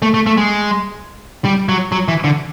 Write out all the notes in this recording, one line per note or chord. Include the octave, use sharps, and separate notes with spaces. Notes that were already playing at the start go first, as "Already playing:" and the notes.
A3
A3
A3
G#3
G3
F#3
F#3
E3
D3